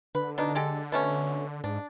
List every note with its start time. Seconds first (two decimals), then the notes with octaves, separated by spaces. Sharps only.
0.15 D3 B4
0.38 B2 D4 D#4
0.55 G#3 G4 A4
0.92 B2 A3 C#4
1.64 G#2 D4